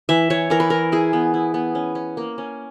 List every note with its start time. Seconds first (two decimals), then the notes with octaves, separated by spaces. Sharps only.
0.09 E3 E5
0.30 E3 C#5
0.50 E3 A#4
0.60 B4
0.70 E3 A#4
0.92 E4 G#4
1.13 B3
1.34 E4
1.54 B3
1.75 C#4
1.95 C#4
2.17 A#3
2.38 C#4